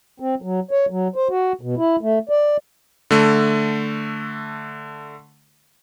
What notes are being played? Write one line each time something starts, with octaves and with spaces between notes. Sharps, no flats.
C4
F#3
C#5
F#3
C5
F#4
B2
E4
A3
D5
D3 A3